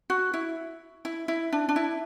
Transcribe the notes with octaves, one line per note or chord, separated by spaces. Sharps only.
F#4
E4
E4
E4
D4
D4
E4